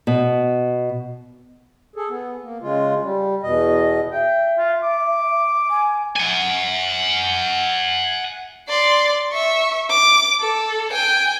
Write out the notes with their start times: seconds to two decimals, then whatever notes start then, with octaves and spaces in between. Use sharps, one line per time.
0.07 B2
1.96 G#4 A4
2.09 B3
2.43 A#3
2.62 C#3 G#3 F4
3.01 G3
3.43 E2 B2 D#5
4.12 E5 G5
4.58 F4
4.83 D6
5.70 G#5
6.16 F#5 G#5
8.69 D5 C6
9.33 E5 C#6
9.90 D6
10.41 A4
10.91 G5 G#5